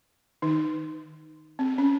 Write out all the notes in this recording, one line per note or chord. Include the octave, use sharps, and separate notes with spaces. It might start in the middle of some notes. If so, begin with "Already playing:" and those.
D#3 D#4
C4
C#4